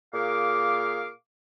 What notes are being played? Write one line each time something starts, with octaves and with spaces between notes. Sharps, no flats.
A#2 G#4 A#4 F5 D6